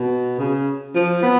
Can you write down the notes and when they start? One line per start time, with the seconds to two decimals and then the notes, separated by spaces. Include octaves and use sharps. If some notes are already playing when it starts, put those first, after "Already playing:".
Already playing: B2
0.39 C#3
0.95 F3
1.23 B3